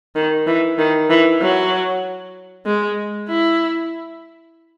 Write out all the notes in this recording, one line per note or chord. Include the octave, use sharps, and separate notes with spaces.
D#3
E3
D#3
E3
F#3
G#3
E4